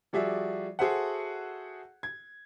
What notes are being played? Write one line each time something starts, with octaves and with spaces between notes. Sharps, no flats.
F3 G3 F#4 G#4 D5 E5
F#4 G#4 A4 C5 E5 F#5
G#6